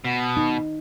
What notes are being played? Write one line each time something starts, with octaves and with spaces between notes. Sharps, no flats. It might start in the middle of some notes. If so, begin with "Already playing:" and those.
B2
D#4